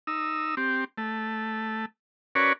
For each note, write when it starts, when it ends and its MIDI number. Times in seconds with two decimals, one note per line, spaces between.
0.07 0.55 63
0.07 0.55 88
0.57 0.84 60
0.57 0.84 67
0.98 1.86 57
2.35 2.53 61
2.35 2.53 66
2.35 2.53 70
2.35 2.53 71
2.35 2.53 73
2.35 2.53 74